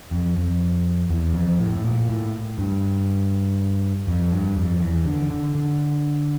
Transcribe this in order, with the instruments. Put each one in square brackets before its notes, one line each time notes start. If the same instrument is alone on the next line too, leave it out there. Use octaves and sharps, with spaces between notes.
[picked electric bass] F2
F2
E2
F2
A2
A2
A#2
A2
G2
F2
G2
F2
E2
D3
D3
D3